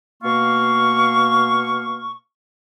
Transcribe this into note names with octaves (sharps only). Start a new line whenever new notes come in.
B2 A#3 F5 C#6